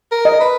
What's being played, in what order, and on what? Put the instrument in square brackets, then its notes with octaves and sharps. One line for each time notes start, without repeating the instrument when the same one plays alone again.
[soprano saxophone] A#4
[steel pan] D#5
[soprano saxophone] B4